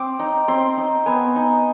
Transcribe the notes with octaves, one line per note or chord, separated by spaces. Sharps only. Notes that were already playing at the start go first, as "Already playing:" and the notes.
Already playing: C4 D6
D#4
C4 C6
D#4
B3 G#5
D#4